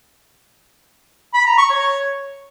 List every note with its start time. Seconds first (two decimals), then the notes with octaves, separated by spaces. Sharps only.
1.34 B5
1.46 A#5
1.58 C#6
1.70 C#5